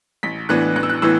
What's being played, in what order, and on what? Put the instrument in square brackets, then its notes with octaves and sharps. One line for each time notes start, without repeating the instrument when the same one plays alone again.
[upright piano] A1 B6
A2 E3 B3 D4 F#6
A1 F#6
E6
F#6
A2 E3 B3 E6